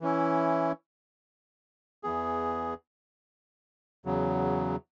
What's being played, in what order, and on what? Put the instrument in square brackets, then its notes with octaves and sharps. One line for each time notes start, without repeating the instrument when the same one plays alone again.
[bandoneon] E3 C#4 E4
E2 E3 B3 G#4
E2 C#3 F#3